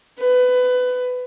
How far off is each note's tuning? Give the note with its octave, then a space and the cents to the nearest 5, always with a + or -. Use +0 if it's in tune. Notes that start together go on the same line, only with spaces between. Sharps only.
B4 +20